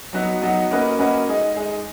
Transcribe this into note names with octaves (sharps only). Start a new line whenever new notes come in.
F#3 B3 D#4 F#4
F#3 B3 D#4 F#4
A#3 C#4 F#4 B4 D#5
A#3 C#4 F#4 B4 D#5
G#3 D#4 G#4 D#5
G#3 D#4 G#4 D#5